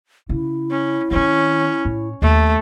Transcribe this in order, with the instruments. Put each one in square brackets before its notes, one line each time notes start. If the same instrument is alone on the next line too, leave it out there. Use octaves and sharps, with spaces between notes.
[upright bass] C#3 [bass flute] E4
[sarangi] C#4
[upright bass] D#3 C4 [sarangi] C#4
[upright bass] A2
[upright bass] D#2 [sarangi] A3